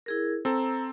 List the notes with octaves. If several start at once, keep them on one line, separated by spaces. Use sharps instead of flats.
E4 G#4 A#4
C4 A4 A#5 E6